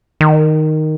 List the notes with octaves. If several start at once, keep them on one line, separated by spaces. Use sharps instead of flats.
D#3